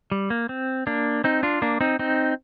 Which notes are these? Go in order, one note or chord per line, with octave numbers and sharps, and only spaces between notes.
G3
A#3
C4
A#3 D4
C4 D#4
D4 F4
A#3 D4
C4 D#4
C4 D#4